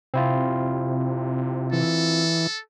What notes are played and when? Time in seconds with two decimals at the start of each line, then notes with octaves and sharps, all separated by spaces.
0.14 C3 C4 E4 F4
1.73 E3 A4